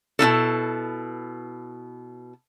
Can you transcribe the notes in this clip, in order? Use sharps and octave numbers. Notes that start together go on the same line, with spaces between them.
B2 D#4 E4 A4